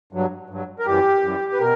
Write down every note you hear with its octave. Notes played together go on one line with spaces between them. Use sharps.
G2 F#3
G2 F#3
A#4
F#2 E3 G3 G4
F#2 E3 G3
B4
B2 A#4